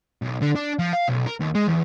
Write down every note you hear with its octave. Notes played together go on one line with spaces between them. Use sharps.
B1
D3
D4
F3
F5
B1
A#4
D#2
G#3
E2